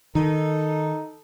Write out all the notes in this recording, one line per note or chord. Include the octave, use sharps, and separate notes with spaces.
D#3 D#4 A4